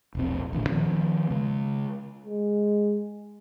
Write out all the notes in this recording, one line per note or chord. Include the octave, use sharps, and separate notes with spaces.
E1 A#1 C4
A1 A#2 D3
D#3 F3 B3
C#3 G#3
G#3